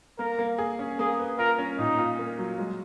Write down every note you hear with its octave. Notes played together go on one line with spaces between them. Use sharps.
A#3 A#4
A#3
G#4
C#4
A#3 G#4
B4
F4 A#4
C#4
A#2 D#4
F4
A#3
F#3
G#3